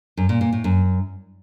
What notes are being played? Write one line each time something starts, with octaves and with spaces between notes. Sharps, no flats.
F#2
A#2
A#2
A2
F#2